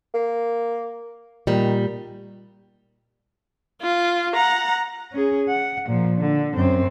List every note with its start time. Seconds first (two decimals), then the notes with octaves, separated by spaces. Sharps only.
0.14 A#3
1.47 A#2 D#3 G3
3.82 F4
4.35 F#5 A#5
5.12 C#4 G#4
5.49 F#5
5.88 A#2 F3
6.18 D3
6.55 F#2 C4